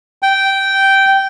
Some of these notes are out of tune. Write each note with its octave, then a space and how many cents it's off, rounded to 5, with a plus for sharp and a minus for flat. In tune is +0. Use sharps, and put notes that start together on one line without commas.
G5 -10